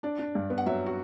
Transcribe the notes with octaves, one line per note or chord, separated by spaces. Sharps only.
D4 D5
D4
G2
B3
F#5
F#3 E5
F#4